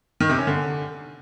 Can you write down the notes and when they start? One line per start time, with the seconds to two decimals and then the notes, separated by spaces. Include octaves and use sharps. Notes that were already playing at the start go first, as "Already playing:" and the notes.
0.20 D#3
0.29 C3
0.38 C#4
0.47 D3